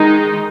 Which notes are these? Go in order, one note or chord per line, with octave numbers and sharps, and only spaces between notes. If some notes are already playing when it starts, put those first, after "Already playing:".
Already playing: D#3 G#3 D#4